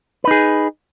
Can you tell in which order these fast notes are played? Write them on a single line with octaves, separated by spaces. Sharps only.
B4 D#4 G#4